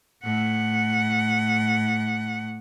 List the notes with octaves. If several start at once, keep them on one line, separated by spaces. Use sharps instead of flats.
A2 F#5